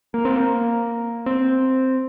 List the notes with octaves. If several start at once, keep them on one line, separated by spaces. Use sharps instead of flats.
A#3
C4
A#3
C4